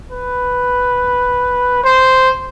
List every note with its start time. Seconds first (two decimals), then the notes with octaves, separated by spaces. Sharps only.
0.11 B4
1.84 C5